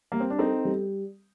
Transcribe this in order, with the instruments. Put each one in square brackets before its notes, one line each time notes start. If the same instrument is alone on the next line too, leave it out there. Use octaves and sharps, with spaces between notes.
[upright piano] G3 [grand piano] A#3
[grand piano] C4
D4
[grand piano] C4 D#4 [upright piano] A4
[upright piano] G3